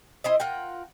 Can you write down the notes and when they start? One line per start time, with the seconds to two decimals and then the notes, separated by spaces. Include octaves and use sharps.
0.24 E4 C5 D#5
0.40 F4 A#4 F#5 G5